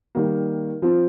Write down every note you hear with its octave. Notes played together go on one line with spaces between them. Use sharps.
D#3 G3 A#3
F3 C4 F4